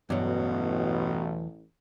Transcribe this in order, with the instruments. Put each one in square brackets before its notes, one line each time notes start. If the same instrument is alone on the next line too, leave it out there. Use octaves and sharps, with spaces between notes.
[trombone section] A1 [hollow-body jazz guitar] E2 F#3 [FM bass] G2 [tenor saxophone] B2